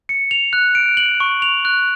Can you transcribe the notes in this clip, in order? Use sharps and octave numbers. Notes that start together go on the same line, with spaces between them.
C#7
F7
F#6
D7
F#7
C#6
F7
F#6